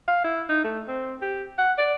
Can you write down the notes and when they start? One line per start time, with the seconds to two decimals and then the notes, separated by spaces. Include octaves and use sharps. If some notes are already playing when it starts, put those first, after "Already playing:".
0.08 F5
0.24 E4
0.49 D#4
0.64 A3
0.88 C4
1.22 G4
1.58 F#5
1.78 D5